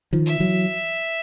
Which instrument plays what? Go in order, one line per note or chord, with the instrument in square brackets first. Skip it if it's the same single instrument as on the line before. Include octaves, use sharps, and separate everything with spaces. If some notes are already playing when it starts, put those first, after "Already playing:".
[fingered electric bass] D#3 F3
[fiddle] E5
[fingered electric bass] E3 F#3